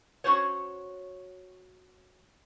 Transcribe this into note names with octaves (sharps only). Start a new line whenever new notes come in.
C#4 E4 F#4 C5 C#5